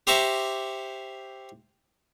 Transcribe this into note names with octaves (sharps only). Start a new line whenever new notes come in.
G4 C5 E5 A#5 C#6 D6